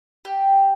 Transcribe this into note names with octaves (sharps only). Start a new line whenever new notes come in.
G4